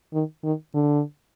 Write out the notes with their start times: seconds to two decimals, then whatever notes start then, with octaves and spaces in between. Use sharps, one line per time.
0.13 D#3
0.44 D#3
0.74 D3